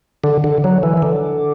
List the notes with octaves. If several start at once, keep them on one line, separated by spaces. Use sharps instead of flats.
D3
D3
F#3
E3
E3
D3